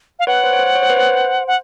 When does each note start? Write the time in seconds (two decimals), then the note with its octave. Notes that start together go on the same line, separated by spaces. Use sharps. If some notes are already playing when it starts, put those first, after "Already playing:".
0.19 F5
0.27 B4 C#5 F#5
0.44 C5
0.53 C#5
0.59 C5
0.75 C#5
0.83 C5
0.90 B4
0.97 C5
1.47 F#5